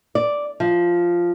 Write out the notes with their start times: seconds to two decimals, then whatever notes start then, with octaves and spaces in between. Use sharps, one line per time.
0.15 D5
0.60 F3